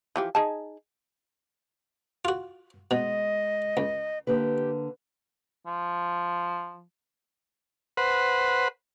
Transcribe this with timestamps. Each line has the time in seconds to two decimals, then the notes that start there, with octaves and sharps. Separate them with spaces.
0.16 E3 F3 G4
0.35 D#4 G#4 A5
2.25 F4 F#4
2.91 B2 G#3 D#5
3.77 C#2
4.27 D3 A#3 G4 B4
5.66 F3
7.97 B4 C5 F#5